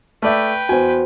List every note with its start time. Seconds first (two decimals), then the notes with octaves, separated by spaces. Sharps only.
0.22 A3 B4 D5 E5 G5
0.69 E2 F#4 C5 G#5